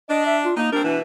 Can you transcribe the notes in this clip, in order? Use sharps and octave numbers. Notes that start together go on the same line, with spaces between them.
D4 D#5
E5
F4
A#3 D#4
G3 C4 D4 A#4
B2 E3